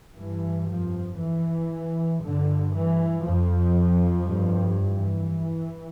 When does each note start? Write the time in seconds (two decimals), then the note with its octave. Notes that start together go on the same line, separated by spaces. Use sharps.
0.16 G2 E3
0.68 F2 F3
1.19 E3
2.23 G2 D3
2.74 E3
3.27 F2 F3
4.29 G2
4.82 E3